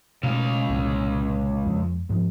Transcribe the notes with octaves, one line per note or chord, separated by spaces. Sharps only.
C#2 B2 A3 F5
C2 A#2
F2
G#2 F3